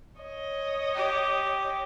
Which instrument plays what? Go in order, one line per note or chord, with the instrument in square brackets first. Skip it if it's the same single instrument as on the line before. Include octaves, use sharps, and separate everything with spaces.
[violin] C#5 D#5
[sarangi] G4